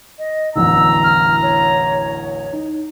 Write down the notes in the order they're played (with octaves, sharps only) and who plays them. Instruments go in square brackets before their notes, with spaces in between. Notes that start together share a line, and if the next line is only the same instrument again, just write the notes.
[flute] D#5
[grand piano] D1 A1 E2 [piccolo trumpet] A#5 [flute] E6
[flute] F6
C#5
[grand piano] D#4